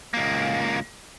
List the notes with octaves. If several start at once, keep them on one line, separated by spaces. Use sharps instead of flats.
C#2 A#3